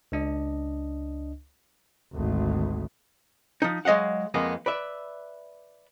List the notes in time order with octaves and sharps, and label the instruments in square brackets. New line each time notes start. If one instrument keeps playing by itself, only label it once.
[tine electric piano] C#2 D4 D#5
[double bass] G#1 D2
[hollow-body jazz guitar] F3 D#4
F#3 G#3 D#5 F5 F#5
F2 G#3 A#3 B3
B4 D5 E5